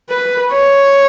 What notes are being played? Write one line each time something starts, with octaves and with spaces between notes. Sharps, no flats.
B4
C#5